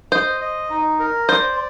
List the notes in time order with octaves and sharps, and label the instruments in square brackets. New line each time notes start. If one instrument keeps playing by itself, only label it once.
[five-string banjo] C5 [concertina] D#5
[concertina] D#5
D#4
A#4
[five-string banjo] C5 [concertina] D5